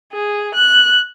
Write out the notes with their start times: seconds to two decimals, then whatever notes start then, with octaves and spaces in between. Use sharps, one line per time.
0.13 G#4
0.55 F#6